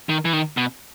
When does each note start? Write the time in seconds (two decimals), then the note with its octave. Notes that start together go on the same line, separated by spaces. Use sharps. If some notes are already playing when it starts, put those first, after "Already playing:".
0.09 D#3
0.25 E3
0.33 D#3
0.57 B2